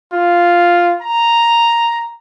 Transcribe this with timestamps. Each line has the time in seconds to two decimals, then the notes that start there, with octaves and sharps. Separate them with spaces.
0.13 F4
1.02 A#5